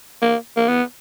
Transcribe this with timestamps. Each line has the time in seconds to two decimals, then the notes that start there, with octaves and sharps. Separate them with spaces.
0.22 A#3
0.57 A#3
0.68 B3